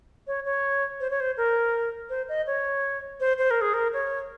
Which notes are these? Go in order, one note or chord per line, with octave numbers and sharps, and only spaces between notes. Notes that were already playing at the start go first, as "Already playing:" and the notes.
C#5
C#5
C5
C#5
C5
A#4
C5
D#5
C#5
C5
C5
A#4
G#4
A#4
C#5